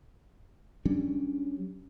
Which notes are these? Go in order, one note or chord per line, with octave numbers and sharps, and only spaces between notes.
F#3 G3 C#4 D4